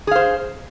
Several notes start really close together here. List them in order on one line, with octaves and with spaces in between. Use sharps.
G#4 F5 C5